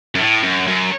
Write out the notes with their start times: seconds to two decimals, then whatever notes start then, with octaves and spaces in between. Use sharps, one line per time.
0.15 F#2
0.19 A2
0.43 F#2
0.67 F#2